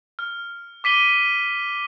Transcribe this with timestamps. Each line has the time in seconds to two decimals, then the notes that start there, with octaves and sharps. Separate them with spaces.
0.19 F6
0.84 D6 B6 D#7 G7